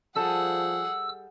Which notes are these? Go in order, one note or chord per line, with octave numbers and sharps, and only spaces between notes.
F3 G3 G#4 A4 F#5 E6